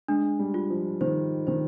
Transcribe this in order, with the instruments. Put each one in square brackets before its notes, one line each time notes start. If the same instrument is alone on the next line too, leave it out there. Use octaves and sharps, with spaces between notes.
[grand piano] G#3 [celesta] D4
[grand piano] G3
[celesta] F4
[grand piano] F3
[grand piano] D#3 [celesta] C5
[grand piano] D#3 [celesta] C5